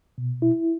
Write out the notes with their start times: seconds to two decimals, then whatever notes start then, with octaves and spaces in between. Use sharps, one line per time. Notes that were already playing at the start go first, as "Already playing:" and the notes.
0.18 B2
0.42 E4